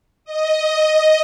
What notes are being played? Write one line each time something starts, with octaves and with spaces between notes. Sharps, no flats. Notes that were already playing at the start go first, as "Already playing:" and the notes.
D#5